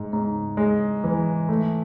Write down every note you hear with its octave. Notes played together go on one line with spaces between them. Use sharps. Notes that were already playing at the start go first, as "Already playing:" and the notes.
Already playing: G#2
G#2
G#3
E3
A3